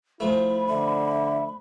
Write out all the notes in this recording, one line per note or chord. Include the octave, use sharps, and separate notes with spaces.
F3 A3 E4 B5
D3 E5